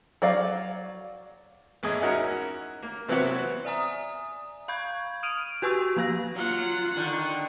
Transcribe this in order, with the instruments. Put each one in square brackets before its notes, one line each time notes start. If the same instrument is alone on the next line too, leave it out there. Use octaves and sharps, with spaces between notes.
[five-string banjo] F#3 D5 F5
[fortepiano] A1 E2 G#4 D#5
C#4 D#4 E4 F#4 A#4
A#3
C3 E3 F#3 B3 C4 F#4
[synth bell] D5 E5 G#5 A#5 D#6
F5 B5 C#6 G6 G#6
D#6 F6 D7 D#7 F7
F#4 G4 B4 G#5 C#6 E6
F3 A#3 F5 A#6
[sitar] F#3 [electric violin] F4 F#5
[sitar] D3 D#3